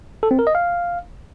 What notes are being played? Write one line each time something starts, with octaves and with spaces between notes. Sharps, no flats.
A4
C4
A#4
D#5
F5